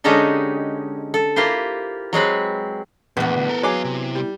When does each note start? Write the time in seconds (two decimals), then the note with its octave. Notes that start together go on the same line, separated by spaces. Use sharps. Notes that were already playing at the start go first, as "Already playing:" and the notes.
0.04 D3 G#3 C#4 D#4 G4 A4
1.14 A4
1.36 A#3 E4 F4 G4 C5
2.13 F#3 G#3 C4 B4
3.17 A#1 E2 E3 B3
3.37 D2
3.49 A4 A#4
3.63 F#3 D#4 G#4 F5 D6
3.84 C3
4.15 G3